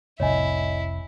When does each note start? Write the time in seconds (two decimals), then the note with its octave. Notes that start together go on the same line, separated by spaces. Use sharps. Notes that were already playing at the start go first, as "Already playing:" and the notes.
0.20 F1 C2 E4 C#5 D#5 G#5